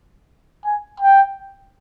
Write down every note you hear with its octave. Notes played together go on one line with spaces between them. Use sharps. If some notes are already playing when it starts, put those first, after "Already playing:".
G#5
G5